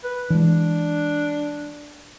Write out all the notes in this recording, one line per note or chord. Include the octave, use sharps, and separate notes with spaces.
B4
E3 G#3 D4